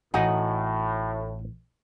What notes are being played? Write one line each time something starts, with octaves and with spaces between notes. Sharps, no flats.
A1 A2 D#4 E4 F#4 D#5 F#5 G#5